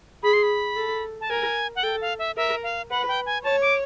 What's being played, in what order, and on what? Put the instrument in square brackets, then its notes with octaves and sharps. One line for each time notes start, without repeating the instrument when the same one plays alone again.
[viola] G#4 [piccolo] B5
[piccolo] C6
B5
[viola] A4
[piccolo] A5
[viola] A#4 [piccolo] G#5
[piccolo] F#5
[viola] A4 [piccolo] G5
[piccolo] F5
E5
[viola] A#4 [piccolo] E5
[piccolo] F5
[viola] B4 [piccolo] F#5
[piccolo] G5
G#5
[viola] C#5 [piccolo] A5
[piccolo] D6